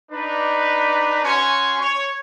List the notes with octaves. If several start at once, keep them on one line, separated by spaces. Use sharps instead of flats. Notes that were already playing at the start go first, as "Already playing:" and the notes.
D4 D#4 B4
C#4 F#4 C#5 G#5 C6 C#6
C#5